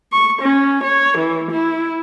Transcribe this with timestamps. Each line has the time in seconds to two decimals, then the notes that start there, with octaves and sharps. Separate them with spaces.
0.13 C#6
0.42 C#4
0.84 C#5
1.18 E3
1.52 E4